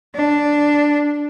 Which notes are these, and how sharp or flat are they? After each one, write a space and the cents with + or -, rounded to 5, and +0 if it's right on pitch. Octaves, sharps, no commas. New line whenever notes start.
D4 +0